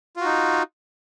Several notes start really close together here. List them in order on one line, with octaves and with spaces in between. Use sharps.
F4 F#4 D#4